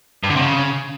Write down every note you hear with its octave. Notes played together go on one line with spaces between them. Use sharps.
G2
D3
C3
C#3